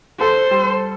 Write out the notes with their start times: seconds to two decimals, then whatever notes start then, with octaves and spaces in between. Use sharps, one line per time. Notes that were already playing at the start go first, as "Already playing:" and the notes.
0.20 A4 C5
0.51 G3